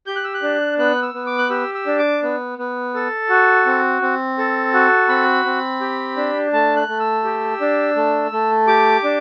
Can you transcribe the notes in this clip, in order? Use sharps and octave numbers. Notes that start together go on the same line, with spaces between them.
G4 G6
F#6
E6
F#6
D4
B3 F#6
E6
B3
D6
F#6
G4 E6
E6
D4
D6
B3
B3
A4
F#4
C4
C4
A4
F#4
C4 B5
C4
G4
D4
A3 A5
F#6
A3
E6
G4
D4
A3
A3
G4 D6
D4